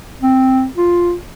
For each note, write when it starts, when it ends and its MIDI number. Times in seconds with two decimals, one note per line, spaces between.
0.22 0.66 60
0.77 1.14 65